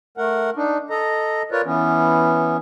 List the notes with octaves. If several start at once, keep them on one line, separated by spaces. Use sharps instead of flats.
A3 A#4 F#5
D4 D#4
A4 D#5 A#5
F4 A#4 B4 C#5 D5
E3 B3 C#4